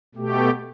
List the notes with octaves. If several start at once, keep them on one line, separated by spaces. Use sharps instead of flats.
B2 A3 G4